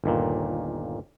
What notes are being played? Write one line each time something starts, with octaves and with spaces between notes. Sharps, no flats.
G1 D#2 A#2